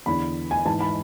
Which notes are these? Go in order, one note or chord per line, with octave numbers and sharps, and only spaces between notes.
E2 D3 B5
G#5
G#2 E3 A5
B5